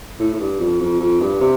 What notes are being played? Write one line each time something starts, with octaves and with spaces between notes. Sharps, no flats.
A2
A2
G2
F2
F2
F2
G2
C3